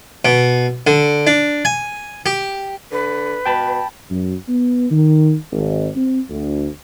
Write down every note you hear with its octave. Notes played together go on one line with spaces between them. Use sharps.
B2
D3
D4
G#5
G4
D3 B4
B2 G5 A5 B5
F#2
B3
D#3
G#1
C4
D2